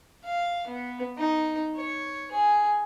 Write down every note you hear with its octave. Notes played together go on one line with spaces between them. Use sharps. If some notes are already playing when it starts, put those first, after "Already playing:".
F5
B3
D#4
C#5
G#4